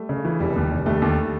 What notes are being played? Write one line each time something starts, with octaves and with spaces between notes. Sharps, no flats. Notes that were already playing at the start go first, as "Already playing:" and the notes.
Already playing: G3 A3
C#3
E3
F1 G3
D#2
F1
D#2 G3 A3
D#2